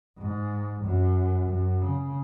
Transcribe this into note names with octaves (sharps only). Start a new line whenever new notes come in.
G#2
F#2
F#2
C#3